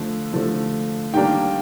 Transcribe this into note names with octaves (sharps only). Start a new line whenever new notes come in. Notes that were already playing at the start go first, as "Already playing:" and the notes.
Already playing: D3 F3 A3
D3 F3 A3
D#3 G3 A#3 D4 G5